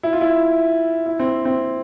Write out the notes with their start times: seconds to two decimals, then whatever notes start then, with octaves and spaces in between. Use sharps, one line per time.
0.03 E4
0.13 F4
0.21 E4
1.06 E4
1.19 C4
1.45 C4